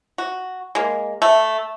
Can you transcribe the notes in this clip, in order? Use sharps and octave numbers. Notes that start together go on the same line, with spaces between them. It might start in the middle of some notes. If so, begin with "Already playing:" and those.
F#4
G#3 A#3
A3